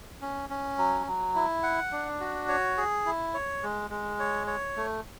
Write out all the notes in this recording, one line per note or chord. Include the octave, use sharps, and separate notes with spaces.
C#4
C#4
F#3
F#3
E4
F#5
D4
F#4
C#5
G#4
E4
C#5
G#3
G#3
C#5
C#5
A3